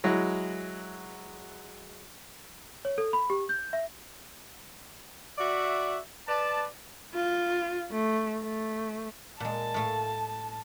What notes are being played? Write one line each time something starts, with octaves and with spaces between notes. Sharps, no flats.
F#3 G#3 E4
C#5
A4
B5
G4
G6
E5
F#4 D5 E5
B4 D5 A5
F4
A3
A3
A#2 G#3 A5
A2 A3 F5